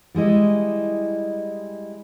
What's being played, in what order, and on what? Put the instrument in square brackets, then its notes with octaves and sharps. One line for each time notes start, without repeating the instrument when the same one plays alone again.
[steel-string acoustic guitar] G3 G#3 E4 D#5